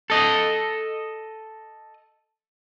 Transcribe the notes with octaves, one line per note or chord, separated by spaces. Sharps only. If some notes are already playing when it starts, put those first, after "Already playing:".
A4 D#5